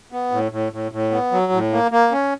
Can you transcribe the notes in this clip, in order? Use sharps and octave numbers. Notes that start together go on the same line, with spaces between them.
B3
A2
A2
A2
A2
B3
F#3
A2
A#3
A#3
C#4